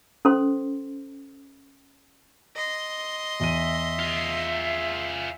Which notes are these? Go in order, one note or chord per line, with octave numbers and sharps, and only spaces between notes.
C#4 A4 C5 C6
D#5 C6
E2 E5 D#7
F4 G#4